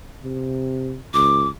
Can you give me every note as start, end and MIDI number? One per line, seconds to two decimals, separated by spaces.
0.24 0.98 48
1.14 1.51 37
1.14 1.48 86